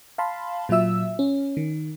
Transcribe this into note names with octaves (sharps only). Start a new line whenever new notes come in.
F5 A5 B5 C6
A#2 F#3 F4 E5 E6
C#4
D#3